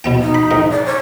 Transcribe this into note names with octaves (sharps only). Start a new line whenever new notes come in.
B2 B3 G5
D#4
B5
G#2 D#3
D5
C#5